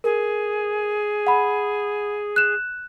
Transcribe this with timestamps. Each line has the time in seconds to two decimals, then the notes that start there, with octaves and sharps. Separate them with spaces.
0.04 G#4 A#4
1.27 F#5 B5
2.36 F#6 E7